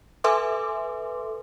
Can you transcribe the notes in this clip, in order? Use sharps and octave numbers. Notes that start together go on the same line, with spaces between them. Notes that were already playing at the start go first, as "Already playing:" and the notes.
A4 B4 E5 G#5 C6 D6